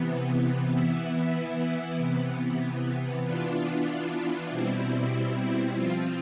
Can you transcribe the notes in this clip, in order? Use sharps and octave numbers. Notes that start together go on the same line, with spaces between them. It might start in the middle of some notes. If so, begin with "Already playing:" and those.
Already playing: C3 E3 B3
E3 B3 E4
C3 E3 B3
E3 B3 D4 F4
B2 G3 C4 E4
F3 C4 F4